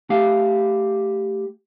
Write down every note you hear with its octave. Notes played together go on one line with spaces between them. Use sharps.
A3 G4 F5